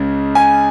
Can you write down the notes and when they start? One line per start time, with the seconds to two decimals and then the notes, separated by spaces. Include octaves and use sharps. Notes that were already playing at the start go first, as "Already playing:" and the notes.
Already playing: C#2 C#3
0.35 G#5